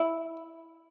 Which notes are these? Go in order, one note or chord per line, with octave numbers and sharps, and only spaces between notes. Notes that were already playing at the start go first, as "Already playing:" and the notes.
Already playing: E4